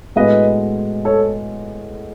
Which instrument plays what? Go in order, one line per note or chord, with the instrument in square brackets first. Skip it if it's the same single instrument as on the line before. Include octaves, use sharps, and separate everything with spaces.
[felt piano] A2 G#3 B3 F#4 [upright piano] B4 D#5
[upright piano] A4 C#5